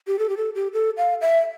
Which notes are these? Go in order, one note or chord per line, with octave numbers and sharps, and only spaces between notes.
G4
A4
G4
A4
G4
A4
F5
E5